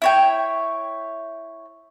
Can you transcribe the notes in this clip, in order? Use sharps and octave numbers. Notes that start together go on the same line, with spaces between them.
E4 C#5 G5